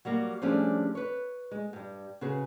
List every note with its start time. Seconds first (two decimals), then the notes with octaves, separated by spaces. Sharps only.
0.05 F#3 G3 A#3 F#4
0.42 F3 G3 A3 C#4 D4 G#4
0.95 B4 C#5
1.51 G#3
1.73 G2 G3
2.21 C#3 F#4 G#4 B4